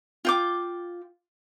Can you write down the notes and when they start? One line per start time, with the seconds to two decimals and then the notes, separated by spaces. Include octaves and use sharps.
0.25 F4 G5 D6